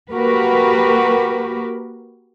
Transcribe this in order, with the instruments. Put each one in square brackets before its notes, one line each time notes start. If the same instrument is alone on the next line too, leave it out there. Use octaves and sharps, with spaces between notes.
[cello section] A#3 F#4 G4 A#4 B4